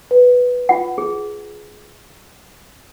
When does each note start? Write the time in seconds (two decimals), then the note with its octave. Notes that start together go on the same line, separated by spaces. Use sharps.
0.11 B4
0.69 F4 F#5
0.98 G#4